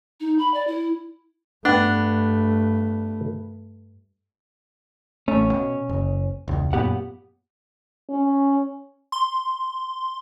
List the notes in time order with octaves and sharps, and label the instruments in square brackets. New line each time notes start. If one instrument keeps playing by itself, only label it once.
[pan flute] D#4
B5
D5
E4
[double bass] G2 A3 [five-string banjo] B3 [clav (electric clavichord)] D4
[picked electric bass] A1 A3 [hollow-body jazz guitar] C#4
[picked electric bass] B2
F#1
E1 C#2
[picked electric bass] F#2 A#2 B3 [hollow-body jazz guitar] G4 F#5
[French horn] C#4
[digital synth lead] C6